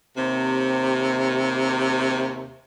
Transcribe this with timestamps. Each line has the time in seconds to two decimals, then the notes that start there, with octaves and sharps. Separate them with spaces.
0.17 D#2 C3